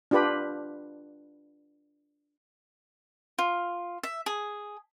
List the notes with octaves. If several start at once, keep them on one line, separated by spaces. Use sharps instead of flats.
D4 F4 G4 B4 B5
F4
E5
G#4